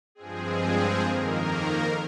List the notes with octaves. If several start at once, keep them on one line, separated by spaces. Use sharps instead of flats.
G2 F3 G#3 C4 G#4
F2 D#3 A#3 A#4